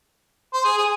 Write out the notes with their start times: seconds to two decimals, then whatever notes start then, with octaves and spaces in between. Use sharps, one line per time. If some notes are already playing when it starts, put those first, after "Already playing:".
0.53 C5
0.65 G#4
0.78 G#4